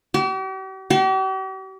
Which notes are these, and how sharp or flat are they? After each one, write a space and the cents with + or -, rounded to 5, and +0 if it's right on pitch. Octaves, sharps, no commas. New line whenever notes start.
G4 -45
G4 -45